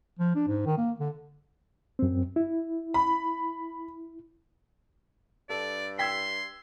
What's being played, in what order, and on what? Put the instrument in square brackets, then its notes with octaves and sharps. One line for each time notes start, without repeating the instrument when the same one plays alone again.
[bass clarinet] F3
D4
G#2
D#3
A#3
D3
[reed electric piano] F#2 C4
E4
[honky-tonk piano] B5
[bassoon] G2 [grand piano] A4 [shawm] D5
[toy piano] G5 [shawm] C6 [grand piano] E6 G#6 B6